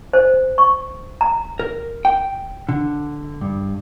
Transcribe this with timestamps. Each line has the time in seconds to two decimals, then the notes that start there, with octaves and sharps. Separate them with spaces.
0.13 C5
0.58 C#6
1.21 A#5
1.59 A#4
2.05 G5
2.69 D3
3.41 G2